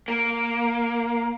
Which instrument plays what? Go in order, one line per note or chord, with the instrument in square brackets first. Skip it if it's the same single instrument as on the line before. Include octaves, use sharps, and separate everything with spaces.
[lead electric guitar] A#3